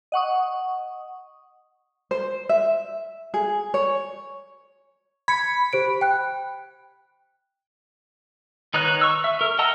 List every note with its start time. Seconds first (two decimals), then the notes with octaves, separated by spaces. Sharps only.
0.12 D#5 F#5 C#6 D#6
2.11 C5
2.49 E5
3.34 G#4
3.74 C#5
5.28 B5 G#6 C#7
5.73 G4 C5 D7
6.01 G5 F#6
8.74 D#3 D#4 B4 C#5 F#6
9.01 C#6 E6
9.24 E5
9.41 A#4
9.59 D#5 F#5 A5 A#5 E6